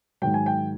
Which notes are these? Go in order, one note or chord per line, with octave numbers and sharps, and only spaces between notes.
G#2 D#3 F#3 G5
G#5
G5